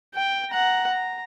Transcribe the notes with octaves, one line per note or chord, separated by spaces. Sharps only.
G5
F#5 A#5
A#5